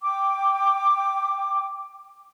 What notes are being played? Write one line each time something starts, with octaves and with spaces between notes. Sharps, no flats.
G5 D6